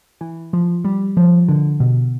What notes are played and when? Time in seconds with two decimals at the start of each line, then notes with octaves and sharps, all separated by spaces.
0.21 E3
0.53 F3
0.85 G3
1.17 F3
1.49 D3
1.80 B2